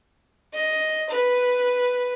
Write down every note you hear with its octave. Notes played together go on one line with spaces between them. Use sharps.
D#5
B4